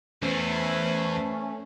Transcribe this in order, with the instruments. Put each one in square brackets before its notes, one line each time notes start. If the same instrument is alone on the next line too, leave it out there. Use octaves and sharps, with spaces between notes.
[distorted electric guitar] E2 [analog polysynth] A3 C#4 [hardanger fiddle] B4 C5